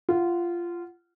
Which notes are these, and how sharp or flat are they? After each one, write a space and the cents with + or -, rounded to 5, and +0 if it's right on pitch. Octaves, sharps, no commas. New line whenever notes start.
F4 -15 F#5 +0